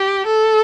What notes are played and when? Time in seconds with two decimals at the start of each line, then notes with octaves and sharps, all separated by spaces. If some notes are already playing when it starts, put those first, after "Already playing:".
Already playing: G4
0.27 A4